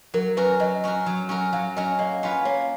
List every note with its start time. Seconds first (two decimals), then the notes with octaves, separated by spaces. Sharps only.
0.14 F#3 A#4
0.37 C#4 F#4 A#4 B4
0.60 F#3 D#5
0.84 C#4 F#4 A#4
1.06 F#3
1.29 C#4 F#4 A#4
1.53 F#3 F5
1.76 C#4 F#4 A#4 D#5
1.99 A#3 D#5
2.23 C#4 F4 B4
2.45 A#3 C#5